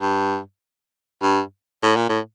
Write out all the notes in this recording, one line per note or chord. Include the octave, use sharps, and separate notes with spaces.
G2
G2
A2
A#2
A2